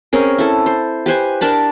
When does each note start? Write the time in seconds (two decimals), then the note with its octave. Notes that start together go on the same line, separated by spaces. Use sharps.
0.13 C4 C#4 G#4 A#4
0.38 E4 A4
0.66 C5
1.06 G4 B4 C5 G#5
1.41 D4 A#4 A5 B5